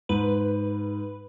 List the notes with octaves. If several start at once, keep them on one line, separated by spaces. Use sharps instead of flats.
G#2 B4